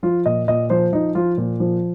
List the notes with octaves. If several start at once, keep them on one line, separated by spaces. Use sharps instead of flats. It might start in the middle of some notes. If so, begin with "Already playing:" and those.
F3 F4
A#2 D#5
A#2 D#5
F3 C5
F3 D#4
F3 F4
A#2
F3